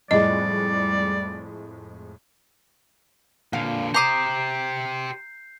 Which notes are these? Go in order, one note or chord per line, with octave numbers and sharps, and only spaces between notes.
F2 A2 G3 G#3 D5 D#5
A#2 D3 F5
G4 C5 A#5 D6 D#6 G6 C7